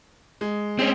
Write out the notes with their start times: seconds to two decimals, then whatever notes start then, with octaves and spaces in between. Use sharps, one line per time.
0.41 G#3
0.79 G#3 C4 C#4